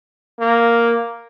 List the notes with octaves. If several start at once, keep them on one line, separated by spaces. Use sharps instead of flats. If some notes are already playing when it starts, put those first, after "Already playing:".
A#3